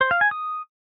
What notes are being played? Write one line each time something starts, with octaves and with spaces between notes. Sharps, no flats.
C5
F5
G#5
D#6